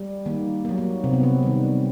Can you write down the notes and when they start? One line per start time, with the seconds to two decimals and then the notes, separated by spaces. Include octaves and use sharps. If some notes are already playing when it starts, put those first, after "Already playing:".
Already playing: G3
0.26 D#3 A#3
0.65 A#3
0.69 F#3
0.78 A#3
1.04 C3 C4
1.13 B3
1.23 C4
1.43 D#3 G3